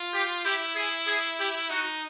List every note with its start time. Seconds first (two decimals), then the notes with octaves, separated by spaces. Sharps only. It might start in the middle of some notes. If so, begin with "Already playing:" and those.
Already playing: F4
0.13 G4
0.45 E4 G4
0.76 G#4
1.07 G#4
1.39 G4
1.70 D#4 F#4